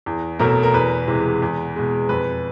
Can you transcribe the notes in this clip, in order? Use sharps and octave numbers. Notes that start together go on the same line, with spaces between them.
E2
B2 F#3 A3 A#4
A#4
E2 B4
C3 E3 G#3
E2
B2 G#3
F2 B4